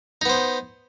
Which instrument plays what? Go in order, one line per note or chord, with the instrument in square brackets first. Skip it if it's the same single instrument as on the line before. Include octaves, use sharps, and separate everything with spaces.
[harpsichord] D#4
B3
C5